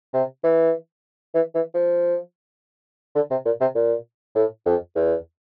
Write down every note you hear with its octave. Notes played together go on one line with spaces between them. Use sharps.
C3
E3
E3
E3
F3
D3
C3
A#2
C3
A#2
A2
F2
E2